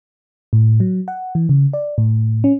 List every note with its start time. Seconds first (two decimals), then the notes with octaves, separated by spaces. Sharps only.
0.53 A2
0.80 F#3
1.08 F#5
1.35 E3
1.49 C#3
1.73 D5
1.98 A2
2.44 C#4